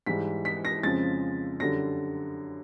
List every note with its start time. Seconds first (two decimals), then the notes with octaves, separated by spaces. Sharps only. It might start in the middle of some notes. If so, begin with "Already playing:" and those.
0.06 G#2 E3 G3 B6
0.45 B6
0.65 A#6
0.83 F2 C#3 F3 G#3 A6
1.60 F#2 D3 G3 A#6